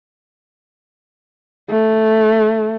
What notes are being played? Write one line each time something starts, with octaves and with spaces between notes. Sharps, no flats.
A3